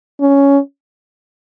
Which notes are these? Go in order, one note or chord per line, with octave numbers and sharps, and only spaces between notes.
C#4